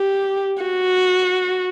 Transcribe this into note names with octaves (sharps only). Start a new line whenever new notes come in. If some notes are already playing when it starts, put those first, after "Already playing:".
Already playing: G4
F#4